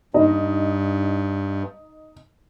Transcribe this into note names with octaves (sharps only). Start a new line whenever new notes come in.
G2 D#4